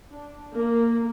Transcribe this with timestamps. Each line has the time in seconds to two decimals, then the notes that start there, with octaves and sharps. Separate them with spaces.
0.11 D4
0.53 A#3